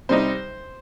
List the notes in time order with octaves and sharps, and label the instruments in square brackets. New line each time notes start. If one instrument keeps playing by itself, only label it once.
[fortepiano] C3 G3 D#4 C5